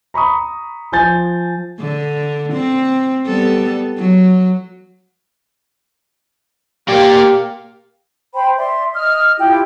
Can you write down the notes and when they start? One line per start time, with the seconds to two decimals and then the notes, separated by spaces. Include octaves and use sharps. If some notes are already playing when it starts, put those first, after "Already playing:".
0.14 A#5 B5 C#6 D#6
0.92 F3 G#5 G6 A6
1.80 D3
2.52 C4
3.26 G3 B3 A4
3.98 F#3
6.88 A#3 G4 A#4 D5 F5
8.34 C5 G5 B5
8.58 D5 E5 C6
8.94 D#5 D#6 F6
9.38 E4 F4 G4 G5